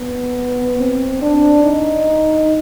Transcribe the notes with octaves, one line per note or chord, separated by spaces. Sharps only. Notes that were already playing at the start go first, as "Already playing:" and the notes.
Already playing: B3
C4
D4
D#4